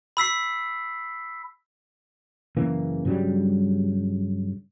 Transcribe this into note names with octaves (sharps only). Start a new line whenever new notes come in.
B5 E6 B6 C7
F#1 C#3 E3 A#3
G2 C#3 F#3 G3